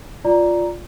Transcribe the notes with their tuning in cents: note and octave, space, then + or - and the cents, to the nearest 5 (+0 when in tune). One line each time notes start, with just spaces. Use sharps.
F4 +0 D5 +0 A#5 +0